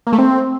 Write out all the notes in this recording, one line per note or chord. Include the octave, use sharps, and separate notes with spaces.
A#3
A3
C4